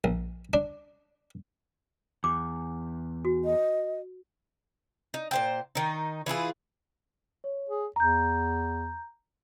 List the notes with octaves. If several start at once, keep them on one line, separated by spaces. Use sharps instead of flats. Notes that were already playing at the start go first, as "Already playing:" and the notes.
A#1
D4
E2 D6
F#4
D#5
D#4
A#2 C5 G5
D#3 D#4
E3 E4 F4 G#4
C#5
G#4
E2 A#5 G6